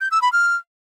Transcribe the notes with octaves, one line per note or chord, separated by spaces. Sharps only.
G6
E6
B5
F6